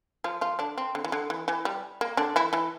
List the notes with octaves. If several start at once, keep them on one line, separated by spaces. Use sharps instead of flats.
F3 F4
F3 F4
D3 D4
C4
D3
E3
D3
E3
E3
G3
A#3
D3 D4
E3 E4
E3 E4